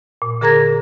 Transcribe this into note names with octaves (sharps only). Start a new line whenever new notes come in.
A#2
D3 G#4 A#4 A#5 G#6 A#6